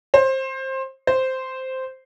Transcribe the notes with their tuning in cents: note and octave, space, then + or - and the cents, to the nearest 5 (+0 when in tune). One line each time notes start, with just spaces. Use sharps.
C5 +20
C5 -5